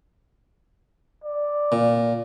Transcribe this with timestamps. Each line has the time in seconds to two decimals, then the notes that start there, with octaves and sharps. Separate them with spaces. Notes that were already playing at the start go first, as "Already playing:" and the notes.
1.24 D5
1.72 A#2